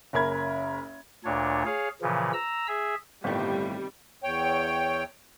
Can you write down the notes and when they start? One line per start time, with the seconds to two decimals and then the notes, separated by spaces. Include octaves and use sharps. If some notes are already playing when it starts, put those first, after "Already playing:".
0.13 F#1 C#4 A#4 B5 G#6
1.24 D2 A#2 D4 C#5
1.66 G#4 C#5 F5
2.02 A#2 C#3 E3 F3
2.33 A#5 E6
2.68 G#4 E5
3.24 G1 A2 C3 D#3 G3 A3
4.23 E2 C#5 G5